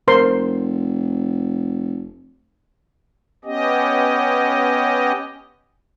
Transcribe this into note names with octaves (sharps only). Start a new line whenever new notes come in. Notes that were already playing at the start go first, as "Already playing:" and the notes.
F1 A#4 C5 C6
B3 C#4 G4 D#5